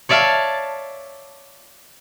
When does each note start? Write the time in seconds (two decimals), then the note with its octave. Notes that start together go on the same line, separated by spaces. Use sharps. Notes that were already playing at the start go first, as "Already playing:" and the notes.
0.09 C#5 D5 E5 F5 A5